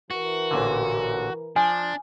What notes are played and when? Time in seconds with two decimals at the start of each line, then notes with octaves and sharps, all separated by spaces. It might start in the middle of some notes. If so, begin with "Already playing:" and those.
0.11 E3 F#4 A#4
0.51 A1 A#2 D3
1.56 F3 D4 G#5